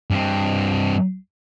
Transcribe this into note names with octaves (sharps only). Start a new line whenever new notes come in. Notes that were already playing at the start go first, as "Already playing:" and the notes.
G2 C4